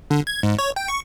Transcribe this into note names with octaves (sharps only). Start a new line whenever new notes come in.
D3
G#6
G#2
C#5
G5
C#6